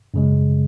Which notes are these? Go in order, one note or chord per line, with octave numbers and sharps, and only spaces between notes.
F#2 C#3 G#3